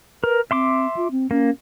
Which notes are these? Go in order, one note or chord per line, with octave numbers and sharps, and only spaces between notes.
A#4 B4
C4 E5 C6 D6
F4
C4
A#3 C#4